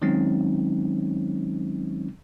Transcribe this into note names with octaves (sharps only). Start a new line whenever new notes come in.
D#3 F#3 G#3 C4 C#4 D#4